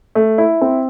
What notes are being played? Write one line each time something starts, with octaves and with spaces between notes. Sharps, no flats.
A3
E4
C4